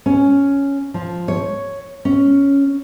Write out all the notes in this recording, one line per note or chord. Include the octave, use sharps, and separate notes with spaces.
C#4
F3
C#5
C#4